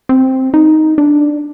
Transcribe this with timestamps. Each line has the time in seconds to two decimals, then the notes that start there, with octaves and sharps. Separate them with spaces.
0.09 C4
0.54 D#4
0.98 D4